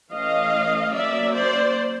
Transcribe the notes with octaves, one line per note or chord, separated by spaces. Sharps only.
E3 A3 C#4 D#5 F5
F#3 A#3 C#4 D5 E5
C5 D5